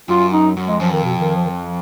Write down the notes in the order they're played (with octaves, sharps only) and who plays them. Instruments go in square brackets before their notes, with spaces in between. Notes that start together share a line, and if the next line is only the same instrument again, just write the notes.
[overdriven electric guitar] F#2 [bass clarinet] F4
[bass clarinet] D#4
[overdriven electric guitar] F#2
[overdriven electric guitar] F2 [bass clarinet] G#3
[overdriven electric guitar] F#2 [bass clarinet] F3
[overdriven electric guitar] F2 [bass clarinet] D#3
[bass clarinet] B2
D#3
F3
D#3
F3